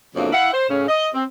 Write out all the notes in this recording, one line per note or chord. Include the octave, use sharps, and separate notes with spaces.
F2 A2 C#3 F#3 A#3 D4
E4 F5 F#5
C5
A2 C#3 C#4
D#5
C4